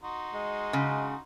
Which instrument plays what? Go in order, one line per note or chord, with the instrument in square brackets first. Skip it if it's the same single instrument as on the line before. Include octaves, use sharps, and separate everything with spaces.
[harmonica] D#4 F#4 C6
[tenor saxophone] G#3
[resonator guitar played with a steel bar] C#3